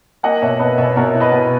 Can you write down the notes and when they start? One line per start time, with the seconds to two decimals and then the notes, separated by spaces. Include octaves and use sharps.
0.23 A#3 D#5 F#5
0.42 B2 C#5 E5
0.59 B2 B4 D#5
0.78 B2 C#5 E5
0.96 B2 A#4 C#5
1.14 E4
1.20 B4 D#5
1.32 B2